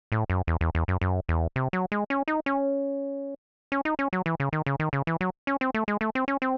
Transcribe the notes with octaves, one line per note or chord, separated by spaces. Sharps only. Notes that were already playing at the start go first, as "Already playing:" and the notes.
A2
F#2
E2
E2
E2
F#2
F#2
E2
C3
F#3
G#3
C#4
D#4
C#4
C#4
D#4
C#4
F#3
E3
C#3
D#3
C#3
D#3
C#3
E3
F#3
C#4
C4
A3
G#3
A3
C4
C#4
C4